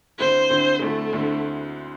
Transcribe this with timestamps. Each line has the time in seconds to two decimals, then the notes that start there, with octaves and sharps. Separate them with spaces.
0.19 D2 D3 C4 E4 C5
0.50 D2 D3 C4 E4
0.81 D2 D3 A3 C4 E4
1.13 D2 D3 C4 E4